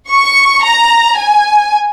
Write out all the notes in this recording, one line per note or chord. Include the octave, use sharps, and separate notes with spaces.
C#6
A#5
G#5